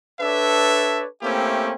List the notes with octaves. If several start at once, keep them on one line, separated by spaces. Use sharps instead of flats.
D4 A4 B4 C#5 D5 E5
A3 A#3 C4 C#4 E4 G4